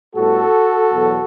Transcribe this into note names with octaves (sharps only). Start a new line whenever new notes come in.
A2 G3 B3 F#4 A4
E2 B2 F#3 B3